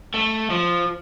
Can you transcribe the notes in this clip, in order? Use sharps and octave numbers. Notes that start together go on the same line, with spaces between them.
A3
F3